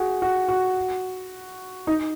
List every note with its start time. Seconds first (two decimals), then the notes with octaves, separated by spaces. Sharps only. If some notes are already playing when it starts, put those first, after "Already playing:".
Already playing: F#4 G#4
0.22 F#4
0.48 F#4
1.87 D#4